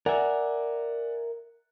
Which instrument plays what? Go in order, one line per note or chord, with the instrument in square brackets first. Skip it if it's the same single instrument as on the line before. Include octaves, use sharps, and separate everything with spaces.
[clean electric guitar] A#4 E5 [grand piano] D5 F#5 G#5